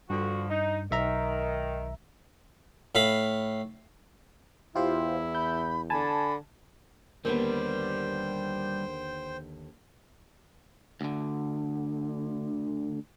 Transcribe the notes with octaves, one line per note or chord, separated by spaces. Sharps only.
G2 D3 F3 F#4
D#4
B1 D#3 E5 A#5
A2 F5 B5
E2 E4 F4 G4 C5
B5 G6
D3 G#5 A5 B5
D#2 D3 G3 B3 A#4 C5 G5
D2 D3